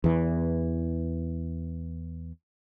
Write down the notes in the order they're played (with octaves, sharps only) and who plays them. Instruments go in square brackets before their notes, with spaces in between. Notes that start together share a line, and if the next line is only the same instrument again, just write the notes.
[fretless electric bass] E2 E3